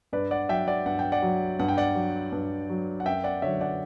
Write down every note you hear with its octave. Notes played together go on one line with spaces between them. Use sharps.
G2 B4 D5
D5 F#5
F#3 E5 G5
D5 F#5
G2 F#5
G5
D5 F#5
F#3
G2 F#5
G5
D5 F#5
F#3
G2
F#3
F#5
F#2 E5 G5
D5 F#5
D3 F#3 C#5 E5
D5 F#5